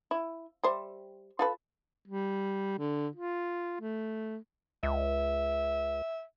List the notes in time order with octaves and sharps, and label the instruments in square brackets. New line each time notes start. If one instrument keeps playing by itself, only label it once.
[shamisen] E4
G3 C5 E5
F4 A4 B4
[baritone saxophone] G3
D3
F4
A3
[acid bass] C#2 [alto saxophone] E5